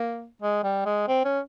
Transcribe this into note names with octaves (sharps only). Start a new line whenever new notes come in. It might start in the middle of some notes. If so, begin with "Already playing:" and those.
Already playing: A#3
G#3
G3
G#3
C4
C#4